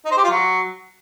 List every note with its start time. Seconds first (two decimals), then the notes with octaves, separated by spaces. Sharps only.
0.05 D#4
0.11 C5
0.18 G4
0.24 F4
0.30 F#3